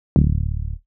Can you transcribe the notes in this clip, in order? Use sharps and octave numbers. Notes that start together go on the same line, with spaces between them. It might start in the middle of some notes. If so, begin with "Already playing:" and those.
D1